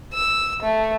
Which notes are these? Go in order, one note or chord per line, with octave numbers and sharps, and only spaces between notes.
E6
A3